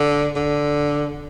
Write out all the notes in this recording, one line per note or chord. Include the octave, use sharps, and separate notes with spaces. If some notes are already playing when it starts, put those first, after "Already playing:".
Already playing: D3
D3